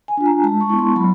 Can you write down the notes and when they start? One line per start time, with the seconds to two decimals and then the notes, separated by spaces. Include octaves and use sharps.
0.08 G#5
0.17 D4 F4
0.26 A#5
0.43 G#3 A5
0.61 C#6
0.70 B3 E4
0.79 C6
0.96 F#3 B5